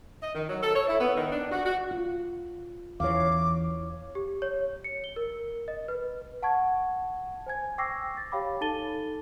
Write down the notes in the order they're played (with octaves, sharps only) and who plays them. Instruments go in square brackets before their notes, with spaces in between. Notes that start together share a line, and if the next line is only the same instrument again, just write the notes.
[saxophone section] D#5
D#3
F#3
A4
C#5
E4
B3
D#3
D4
F#4
F#4
[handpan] F4
[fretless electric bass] E2 E3 [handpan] C#5 F5 [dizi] D6
[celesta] G4
C#5
C#7
G7
A#4
D#5
B4
F#5 A5 C#6 G#6
C5 G#5 G#6
G5 C#6 D6 E6 A#6 C7
A6
G4 C#5 F5 G5 B5 D6
D#4 A4 A5 A6 D#7 G7